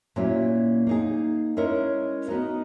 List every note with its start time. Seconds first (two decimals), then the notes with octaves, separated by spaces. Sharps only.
0.16 A#2 F#3 A#3 C#4 E4
0.87 A#3 D#4 G#4
1.57 G#3 C#4 E4 A#4 C#5
2.28 B3 D#4 F#4 A#4 D#5